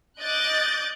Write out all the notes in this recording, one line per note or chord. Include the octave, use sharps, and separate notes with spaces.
D#5 D6 F#6 G6 A6